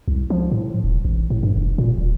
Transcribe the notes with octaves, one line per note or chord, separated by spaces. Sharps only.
C2
F3
A2
D#1
A1
A2
G2
F1
A#2
D#1